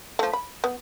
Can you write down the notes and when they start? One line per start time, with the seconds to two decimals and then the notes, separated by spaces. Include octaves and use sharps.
0.19 F3 A3
0.33 B5
0.64 B3